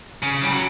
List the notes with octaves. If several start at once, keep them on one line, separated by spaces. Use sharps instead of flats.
C#3
G3
F#3